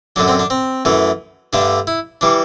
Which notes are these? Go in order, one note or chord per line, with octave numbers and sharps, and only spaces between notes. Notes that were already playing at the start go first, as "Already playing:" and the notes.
F#2 D3 F#3 D4
C4
D4
C4
F#2 E3 A3
G2 D3 A3 D4
E4
E3 G3 D4